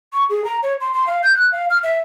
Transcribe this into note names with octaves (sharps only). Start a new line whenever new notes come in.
C#6
G#4
A#5
C#5
C6
C6
F5
G6
F#6
F5
F6
E5